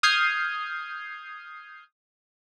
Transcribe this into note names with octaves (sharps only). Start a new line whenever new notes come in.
D#6 F6 G6 G#6 C7